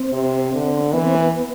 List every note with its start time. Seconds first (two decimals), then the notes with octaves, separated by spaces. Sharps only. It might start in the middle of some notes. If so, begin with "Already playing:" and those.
Already playing: C4
0.13 C3
0.53 D3
0.93 E3 B3
1.04 C4
1.15 B3